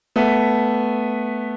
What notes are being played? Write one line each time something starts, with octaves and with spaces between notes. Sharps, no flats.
A3 B3